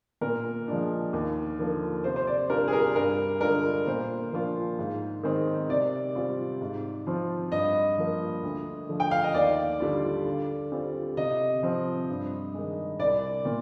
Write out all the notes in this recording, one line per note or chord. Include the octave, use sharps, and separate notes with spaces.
A#2 A#4
F3 G#3 D4
D#2
D3 F3 A#3
C3 C5
C5
D5
G3 D4 F4 A#4
G#4
A#4
G2 A#4
D3 G#3 D4 F4 A#4
A#2 C5
F3 A#3 D4 F4
G#2
D#3 G#3 C4 D#4
C3 D5
G3 C4 F4
G#2
F3 C4 F4
G2 D#5
F3 A#3
D2
D3 F3
G5
F5
D#5
D#2 D5
D3 G3 D4 F4
D3
G3 C4 F4
C3 D#5
F3 C4
G2
D#3 G#3
C2 D5
A#2